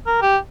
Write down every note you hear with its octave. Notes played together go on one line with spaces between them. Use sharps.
A#4
G4